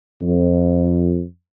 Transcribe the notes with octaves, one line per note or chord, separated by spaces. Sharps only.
F2